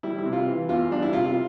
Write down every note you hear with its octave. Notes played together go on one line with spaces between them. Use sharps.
G3 E4
E4
C3
F4
E3
E2 F4
G3 D4
E4
C3 F4
F4